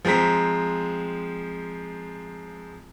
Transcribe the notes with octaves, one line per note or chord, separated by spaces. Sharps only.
F3 G#3 C4 A#5 B6